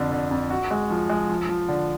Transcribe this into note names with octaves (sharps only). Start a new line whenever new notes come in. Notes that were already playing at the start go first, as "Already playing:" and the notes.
Already playing: F2 D3
D3
F2
F#4
G#3
F3
G#3
F3
F3
D3